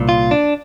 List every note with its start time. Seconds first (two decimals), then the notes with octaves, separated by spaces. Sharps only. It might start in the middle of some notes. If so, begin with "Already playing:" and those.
Already playing: C2 A#2
0.09 F4
0.31 D4